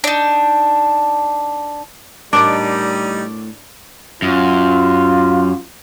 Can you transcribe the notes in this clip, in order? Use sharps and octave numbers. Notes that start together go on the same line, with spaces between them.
D4 D#4
A2 G3 D4 D#4 A#4 D5 D6 D7
F#2 F4